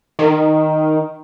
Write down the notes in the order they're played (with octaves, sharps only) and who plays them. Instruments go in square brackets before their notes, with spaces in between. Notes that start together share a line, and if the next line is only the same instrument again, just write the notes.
[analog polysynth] D#3